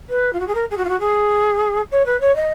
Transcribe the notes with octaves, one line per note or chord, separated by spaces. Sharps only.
B4
F4
F#4
G#4
A#4
G#4
F#4
F4
F#4
G#4
C#5
B4
C#5
D#5